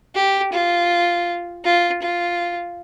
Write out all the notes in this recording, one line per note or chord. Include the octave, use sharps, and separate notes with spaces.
G4
F4
F4
F4